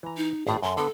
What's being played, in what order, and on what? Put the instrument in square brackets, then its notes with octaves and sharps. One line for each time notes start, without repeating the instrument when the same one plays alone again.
[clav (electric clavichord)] E3 A#5
[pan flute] D#4
[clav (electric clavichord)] G#1 A2 A5 [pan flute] G#4
[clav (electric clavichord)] F#2 A4 [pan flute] C6
[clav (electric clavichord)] D3 B3 [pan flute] A4